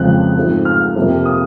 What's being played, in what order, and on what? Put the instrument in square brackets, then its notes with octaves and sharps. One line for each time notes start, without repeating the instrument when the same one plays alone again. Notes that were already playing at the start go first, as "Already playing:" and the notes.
Already playing: [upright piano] F2 C#3 F3 G#3 C4 F#6
G#2 F3 A3 C4
F6
F2 C3 F3 A#3
D#6